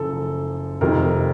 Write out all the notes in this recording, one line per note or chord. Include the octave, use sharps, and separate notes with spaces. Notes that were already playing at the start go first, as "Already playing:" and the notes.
Already playing: F#1 F#2 F3 A4
F1 F2 C3 D#3 A#4